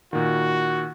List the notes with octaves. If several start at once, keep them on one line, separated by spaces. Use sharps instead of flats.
A#2 D#3 F#4